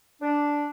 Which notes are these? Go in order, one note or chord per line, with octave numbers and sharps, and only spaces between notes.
D4